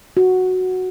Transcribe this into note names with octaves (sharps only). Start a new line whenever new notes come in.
F#4